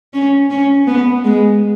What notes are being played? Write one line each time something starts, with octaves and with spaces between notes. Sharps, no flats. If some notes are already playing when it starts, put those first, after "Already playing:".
C#4
C#4
B3
G#3